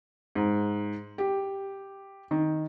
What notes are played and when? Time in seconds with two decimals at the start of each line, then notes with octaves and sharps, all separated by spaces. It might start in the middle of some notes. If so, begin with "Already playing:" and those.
0.35 G#2
1.18 G4
2.31 D#3